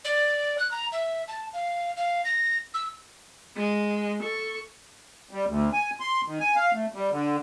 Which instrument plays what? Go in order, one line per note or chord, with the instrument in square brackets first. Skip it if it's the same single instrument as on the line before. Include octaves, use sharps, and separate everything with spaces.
[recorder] D5
F#6
A#5
E5
A5
F5
F5
A#6
E6
[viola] G#3
A4 C#6
[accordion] G3
D2
G#5
C6
D#3
G#5
F5
A3
G3
D3